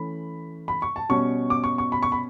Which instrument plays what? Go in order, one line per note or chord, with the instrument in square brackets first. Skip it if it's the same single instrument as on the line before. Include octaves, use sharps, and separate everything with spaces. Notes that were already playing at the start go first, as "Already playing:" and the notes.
Already playing: [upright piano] E3 A3 C#4 B5
B5
C#6
A5
B2 G3 C#4 C#6
D6
C#6
C#6
B5
C#6
B5